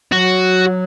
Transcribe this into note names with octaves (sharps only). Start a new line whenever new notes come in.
F#3 F#4